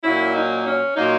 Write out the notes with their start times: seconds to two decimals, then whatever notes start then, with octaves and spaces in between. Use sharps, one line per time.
0.04 A#2 F#3 A#3 C#4 E4
0.34 D#4
0.65 C#4
0.95 A#2 F#3 A#3 C#4 D#4